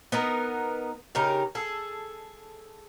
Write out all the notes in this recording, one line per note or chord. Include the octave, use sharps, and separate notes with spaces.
B3 D#4 A#4
C#3 D#4 G4 A#4
G#4 A4